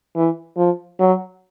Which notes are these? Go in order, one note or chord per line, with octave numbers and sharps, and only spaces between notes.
E3
F3
F#3